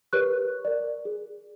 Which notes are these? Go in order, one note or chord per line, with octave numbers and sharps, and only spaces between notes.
G4 A#4 B4 C#5 C#6 F#6
A#4 D5
G#4